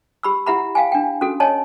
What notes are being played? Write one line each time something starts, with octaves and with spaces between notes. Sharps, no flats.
G4 B5 E6
E4 G4 E5 F#5 A#5 B5
F5 G5 G#5
D4 G5
C#4 F#4 A4
C#5 D#5 G#5 A5